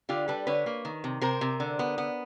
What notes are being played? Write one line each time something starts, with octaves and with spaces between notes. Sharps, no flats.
D3 F4 G4
G3 A4 B4
D3 B4 C#5
A#3
D#3
C3
C3 A#4 C5
C3
D3
B3
B3